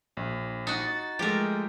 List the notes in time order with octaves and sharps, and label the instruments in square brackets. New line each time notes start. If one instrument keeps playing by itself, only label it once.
[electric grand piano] A#1
[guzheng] D#4 F#4 [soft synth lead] A6
[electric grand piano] F3 G#3 A3 [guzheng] G4 A#4